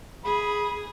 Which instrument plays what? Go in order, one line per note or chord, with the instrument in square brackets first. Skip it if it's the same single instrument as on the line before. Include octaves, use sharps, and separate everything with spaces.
[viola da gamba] G#4 [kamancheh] B5